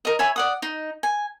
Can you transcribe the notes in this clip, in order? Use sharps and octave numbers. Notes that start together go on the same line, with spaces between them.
A#4 D#5
C#5 E5 G#5 B5
D5 F#5 D#6
D#4
G#5